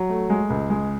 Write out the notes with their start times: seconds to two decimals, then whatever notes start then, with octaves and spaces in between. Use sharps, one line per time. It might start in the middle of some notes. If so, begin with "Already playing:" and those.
Already playing: F#3
0.09 A3
0.30 G#3
0.50 C#2
0.70 G#3